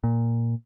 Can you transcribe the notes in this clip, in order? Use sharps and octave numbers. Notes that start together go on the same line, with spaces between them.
A#2